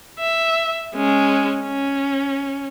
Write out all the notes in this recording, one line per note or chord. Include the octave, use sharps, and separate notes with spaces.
E5
G#3 C#4
C#4